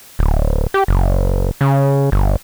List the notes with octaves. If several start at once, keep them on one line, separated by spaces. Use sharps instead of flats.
D1
G4
F#1
C#3
G1